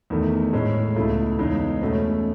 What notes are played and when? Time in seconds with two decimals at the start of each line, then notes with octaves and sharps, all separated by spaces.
0.10 E2 D#3 A3
0.53 A2 G#3 C#4
0.96 C#2 B2 A3 E4
1.39 E2 C#3 G#3 D#4
1.81 E2 B2 A3 C#4